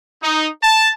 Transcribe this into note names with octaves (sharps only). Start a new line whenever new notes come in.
D#4
A5